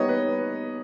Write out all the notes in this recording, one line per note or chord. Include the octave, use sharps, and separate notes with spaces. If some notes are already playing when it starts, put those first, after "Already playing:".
Already playing: G3 B3 D#4 C#5 D#5
B4